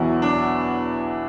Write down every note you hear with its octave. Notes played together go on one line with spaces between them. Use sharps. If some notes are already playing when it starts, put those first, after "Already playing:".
Already playing: E2 B2 F#3 E4
D4